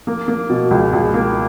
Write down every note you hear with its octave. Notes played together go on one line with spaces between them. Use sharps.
A#3
A#3
B2
C#2
C#2
A#3